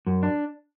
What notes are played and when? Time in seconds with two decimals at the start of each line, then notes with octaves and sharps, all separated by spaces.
0.06 F#2
0.23 D4